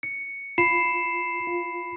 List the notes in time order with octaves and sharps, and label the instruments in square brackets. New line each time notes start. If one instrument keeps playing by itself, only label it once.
[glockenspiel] C#7
[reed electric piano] F4 [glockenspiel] B5 C7 E7
[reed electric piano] F4